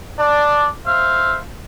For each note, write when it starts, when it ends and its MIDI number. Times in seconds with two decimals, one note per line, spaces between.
0.19 0.66 62
0.19 0.66 74
0.86 1.37 72
0.86 1.37 76
0.86 1.37 77